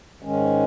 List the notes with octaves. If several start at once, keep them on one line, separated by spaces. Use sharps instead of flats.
G#2 D#3 G#3 C#4